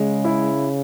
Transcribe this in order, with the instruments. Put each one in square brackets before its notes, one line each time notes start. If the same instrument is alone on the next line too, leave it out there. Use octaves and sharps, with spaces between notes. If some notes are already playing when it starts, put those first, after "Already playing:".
Already playing: [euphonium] C#3 [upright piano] G#3
[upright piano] E4